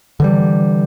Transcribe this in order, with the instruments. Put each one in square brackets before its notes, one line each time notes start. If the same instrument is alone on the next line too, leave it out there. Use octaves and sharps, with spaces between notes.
[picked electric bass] D3 E3 G3